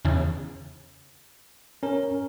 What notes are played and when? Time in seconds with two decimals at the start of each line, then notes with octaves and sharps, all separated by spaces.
0.05 E2 C#3
1.83 C#4 A#4